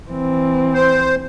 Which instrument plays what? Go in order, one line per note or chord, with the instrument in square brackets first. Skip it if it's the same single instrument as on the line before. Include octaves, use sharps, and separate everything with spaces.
[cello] E3 C4
[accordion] C5